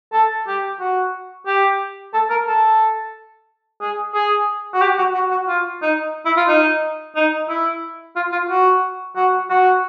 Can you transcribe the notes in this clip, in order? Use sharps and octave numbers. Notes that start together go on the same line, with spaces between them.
A4
G4
F#4
G4
A4
A#4
A4
G#4
G#4
F#4
G4
F#4
F#4
F#4
F4
D#4
E4
F4
D#4
D#4
E4
F4
F4
F#4
F#4
F#4